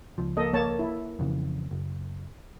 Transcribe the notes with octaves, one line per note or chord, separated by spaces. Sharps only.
C#2 F3
A#3 A4 D#5
A#3 C#5 A5
E4
F2 C#3 E3
F#1